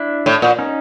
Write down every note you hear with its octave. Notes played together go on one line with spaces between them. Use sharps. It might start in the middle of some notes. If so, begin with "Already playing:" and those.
Already playing: D4 E4
A2
A#2
C#4 D#4